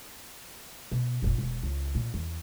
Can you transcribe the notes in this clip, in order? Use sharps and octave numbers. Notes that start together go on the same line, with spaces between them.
B2
F1 A#1
E1
C#2
A#2
E2